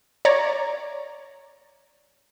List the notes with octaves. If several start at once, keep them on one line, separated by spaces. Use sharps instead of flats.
C#5 D5 A#5